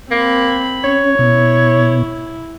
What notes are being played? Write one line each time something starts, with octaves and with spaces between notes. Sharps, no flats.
A#3 C4 B5
C#4 C#5
B2 E4